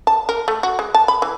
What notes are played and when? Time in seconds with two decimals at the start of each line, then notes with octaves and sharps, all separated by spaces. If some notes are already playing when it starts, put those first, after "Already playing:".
0.07 A5
0.29 A#4
0.48 A3
0.63 F#4
0.79 G#3
0.95 A5
1.08 B5
1.22 E3